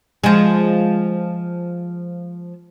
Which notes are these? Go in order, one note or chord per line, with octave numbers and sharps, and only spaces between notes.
F3 G#3